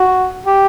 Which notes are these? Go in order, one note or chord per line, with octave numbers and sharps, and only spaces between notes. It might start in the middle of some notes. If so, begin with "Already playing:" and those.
Already playing: F#4
G4